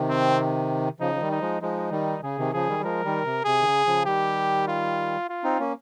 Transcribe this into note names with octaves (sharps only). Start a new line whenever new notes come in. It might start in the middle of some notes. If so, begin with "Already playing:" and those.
Already playing: C3 D#3
C4
C#3 F3 D#4
F3
D#3 G3
D#4
F3 G#3
F3 G#3 D#4
D#3 G3
C#3 G#4
C3 D#3
C#3 F3 G#4
D#3 G3
G3
F3 G#3 A#4
D#3 G3
C3
C3 G#4
D#3
C#3
C#3 F3
D#3 G3 G4
F4
F4
C4 D#4
A#3 C#4